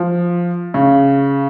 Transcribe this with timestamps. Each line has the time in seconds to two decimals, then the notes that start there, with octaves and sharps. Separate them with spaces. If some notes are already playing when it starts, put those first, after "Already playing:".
Already playing: F3
0.74 C#3